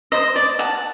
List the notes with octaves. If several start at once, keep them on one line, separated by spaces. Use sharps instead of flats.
C5 D#5
D5
F#5 A5